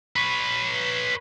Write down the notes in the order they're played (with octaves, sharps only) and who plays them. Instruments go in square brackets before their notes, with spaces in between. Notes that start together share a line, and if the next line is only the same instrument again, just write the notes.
[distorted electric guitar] B4 C#5